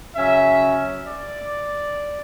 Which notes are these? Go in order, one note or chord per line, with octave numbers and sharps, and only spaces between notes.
C#3 F#3 C#4 E5
D5